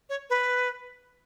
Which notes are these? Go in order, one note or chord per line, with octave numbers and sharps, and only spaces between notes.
C#5
B4